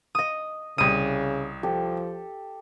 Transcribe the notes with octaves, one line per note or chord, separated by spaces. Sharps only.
D#5 D#6
C2 C#3 D#6 D#7
F3 G4 A4